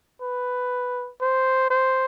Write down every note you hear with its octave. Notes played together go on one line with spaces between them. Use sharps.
B4
C5
C5